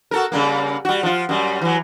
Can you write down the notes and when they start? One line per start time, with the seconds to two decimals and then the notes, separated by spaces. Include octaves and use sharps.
0.11 F#4 A4 A#4
0.32 C#3 G3 A#3
0.85 G3 F#4
1.03 F3 F4
1.29 F#2 G3
1.61 E3 F#3